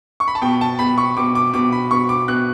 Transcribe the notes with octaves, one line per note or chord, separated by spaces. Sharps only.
C#6
B5
A5
B2 G5
A5
B2 B5
C#6
B2 D6
D6
B2 D6
B5
B2 C#6
D6
B2 F#6